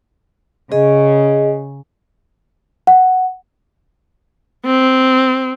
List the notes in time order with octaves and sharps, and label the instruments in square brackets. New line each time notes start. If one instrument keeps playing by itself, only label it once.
[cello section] C#3 [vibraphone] G#4 D#5
[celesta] F#5
[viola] C4